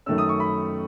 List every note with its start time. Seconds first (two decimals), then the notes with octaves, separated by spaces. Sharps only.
0.06 F#2 D#3 A3 C#4 E6
0.18 D#6
0.29 C#6
0.40 B5